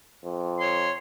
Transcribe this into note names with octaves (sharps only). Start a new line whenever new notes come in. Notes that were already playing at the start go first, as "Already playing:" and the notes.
F2
C#5 C6